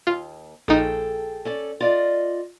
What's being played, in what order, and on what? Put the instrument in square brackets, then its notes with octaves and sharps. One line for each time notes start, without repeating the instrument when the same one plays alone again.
[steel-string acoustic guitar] D#2 [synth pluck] F4
[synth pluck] A#1 D#4 [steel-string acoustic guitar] G#4 A4 G5
[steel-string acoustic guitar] C#4 A4 D5
F4 D5 D#5